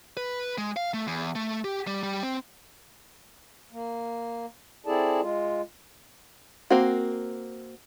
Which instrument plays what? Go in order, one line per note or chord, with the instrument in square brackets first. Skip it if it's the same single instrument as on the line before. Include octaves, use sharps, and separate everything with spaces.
[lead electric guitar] B4
G#3
F5
A3
E2
A3
G4
G3
G3
C4
[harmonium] A#3
C4 E4 G#4 A4 D5 A5
G#3 F4
[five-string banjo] A#3 C4 F#4